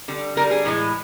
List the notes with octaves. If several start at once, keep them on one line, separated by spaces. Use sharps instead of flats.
D3 G3
D3 G3 A#4
G#4
A2 E3 G#3